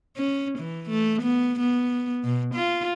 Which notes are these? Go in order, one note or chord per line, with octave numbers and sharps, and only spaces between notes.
C#4
E3
A3
B3
B3
B2
F4